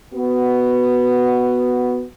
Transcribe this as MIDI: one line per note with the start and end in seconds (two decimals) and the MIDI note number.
0.12 2.03 59
0.12 2.03 66